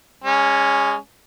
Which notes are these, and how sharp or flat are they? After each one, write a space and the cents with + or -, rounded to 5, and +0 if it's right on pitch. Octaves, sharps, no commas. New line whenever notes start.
G#3 -30 C#4 +0